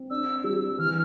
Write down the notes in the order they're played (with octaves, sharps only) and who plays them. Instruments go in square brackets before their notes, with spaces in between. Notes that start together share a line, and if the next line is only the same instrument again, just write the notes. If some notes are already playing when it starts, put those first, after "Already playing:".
Already playing: [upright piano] C4
[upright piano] D4 [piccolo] E6
[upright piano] G3 [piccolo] E6
[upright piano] E3 [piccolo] F6